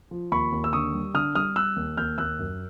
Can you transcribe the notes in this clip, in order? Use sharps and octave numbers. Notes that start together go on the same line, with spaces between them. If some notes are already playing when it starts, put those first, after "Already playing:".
F3
D#2 B5 C#6
D#2
E6
D3 C#6 D#6
G3
D3 D#6 F6
G3 D#6 F6
G3 E6 F#6
D#2
D#2 F6 G6
D#2 E6 F#6
F#2